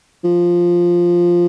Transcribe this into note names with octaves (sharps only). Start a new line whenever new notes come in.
F3